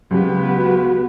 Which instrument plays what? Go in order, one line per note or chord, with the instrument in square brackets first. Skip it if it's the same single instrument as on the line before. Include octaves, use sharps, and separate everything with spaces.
[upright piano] C#2 [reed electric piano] F#3 G4 [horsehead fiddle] B3 B4
[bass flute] F#4